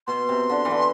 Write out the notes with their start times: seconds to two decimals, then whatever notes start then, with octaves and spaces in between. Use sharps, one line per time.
0.07 B2 C6
0.29 C3
0.50 D3
0.65 E3
0.71 D3